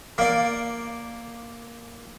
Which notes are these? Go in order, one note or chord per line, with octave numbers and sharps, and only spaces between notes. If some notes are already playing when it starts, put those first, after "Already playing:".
A#3 D5